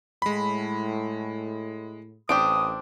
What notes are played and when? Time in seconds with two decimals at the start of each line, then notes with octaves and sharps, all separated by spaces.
0.22 A2 G#3 B5
2.29 A1 C4 D4 G4 D#6 D7